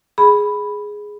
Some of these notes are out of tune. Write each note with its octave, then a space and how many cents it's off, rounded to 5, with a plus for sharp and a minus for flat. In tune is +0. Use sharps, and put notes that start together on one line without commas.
G#4 +0 B5 +0